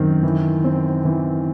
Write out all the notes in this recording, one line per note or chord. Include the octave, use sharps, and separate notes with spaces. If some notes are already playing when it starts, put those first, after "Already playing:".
Already playing: F#2 D#3 C4
E3
C4
E3